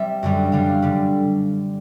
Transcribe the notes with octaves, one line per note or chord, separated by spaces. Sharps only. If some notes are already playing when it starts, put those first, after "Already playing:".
Already playing: G3 C4 E5
F#2 D3 G3
F#2 D3 G3 F5
D3 G3